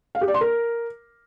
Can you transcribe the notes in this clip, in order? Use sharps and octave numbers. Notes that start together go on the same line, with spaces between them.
F5
G4
D5
C6
A#4